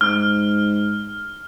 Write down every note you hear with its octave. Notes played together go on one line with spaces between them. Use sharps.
G#2 F6